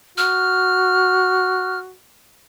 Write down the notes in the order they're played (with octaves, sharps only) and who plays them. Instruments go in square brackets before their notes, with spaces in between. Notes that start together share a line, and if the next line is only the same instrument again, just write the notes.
[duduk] F#4 [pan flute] F6